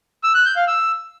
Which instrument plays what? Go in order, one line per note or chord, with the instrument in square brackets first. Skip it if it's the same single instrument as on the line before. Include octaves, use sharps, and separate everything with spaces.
[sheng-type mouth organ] E6
F#6
G6
F5
E6